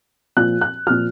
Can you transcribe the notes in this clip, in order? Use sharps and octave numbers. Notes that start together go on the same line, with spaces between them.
A#2 F3 F#6
F#6
A#2 F3 F6